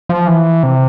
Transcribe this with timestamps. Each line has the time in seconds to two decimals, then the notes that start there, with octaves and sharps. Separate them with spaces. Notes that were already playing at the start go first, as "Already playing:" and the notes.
0.09 F3
0.27 E3
0.63 C3